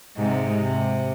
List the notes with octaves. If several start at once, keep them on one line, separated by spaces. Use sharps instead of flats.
G#2 C3 G#3
C3